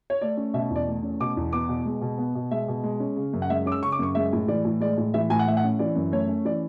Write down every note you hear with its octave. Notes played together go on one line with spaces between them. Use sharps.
C#5
A3 D5
C#4
B2 E5
E2
D5
A3
C#4
B2 D6
E2
B3 D6
B2
G#3
B2
B3
B2
G#3 E5
B2
G#3
C#4
C#3
F#2
F#5
G#3 E5
C#4 D6
E6
C#3 C#6
D6
F#2 C#6
G#3 E5
A2
E3 D5
A2
G#3 D5
A2
E3 E5
A2 G#5
F#5
A3 E5
F#5
C#4
E3 D5
F#2
A3 C#5
C#4
E3 D5